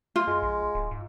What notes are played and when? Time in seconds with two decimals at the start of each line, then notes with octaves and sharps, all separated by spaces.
0.16 A#3 F4
0.27 F#2 G#3
0.42 A#1
0.75 D1
0.91 G#2